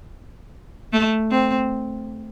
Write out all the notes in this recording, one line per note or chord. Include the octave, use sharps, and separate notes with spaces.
A3
C4